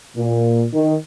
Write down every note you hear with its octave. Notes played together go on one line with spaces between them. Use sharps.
A#2
D#3